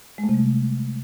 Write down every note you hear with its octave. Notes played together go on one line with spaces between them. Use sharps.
G#3
A3
C3
G3
C3